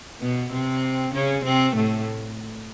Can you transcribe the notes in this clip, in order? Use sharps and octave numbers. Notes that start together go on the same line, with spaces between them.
B2 B3
C3 C4
C#3 C#4
C3 C4
A2 A3